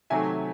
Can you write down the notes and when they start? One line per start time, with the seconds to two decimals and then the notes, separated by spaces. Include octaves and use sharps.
0.10 C3 D#3 F#3 A3 E5 G#5